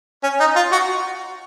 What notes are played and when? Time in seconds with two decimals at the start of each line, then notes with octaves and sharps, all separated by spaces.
0.23 C#4
0.40 D#4
0.56 F4
0.72 F#4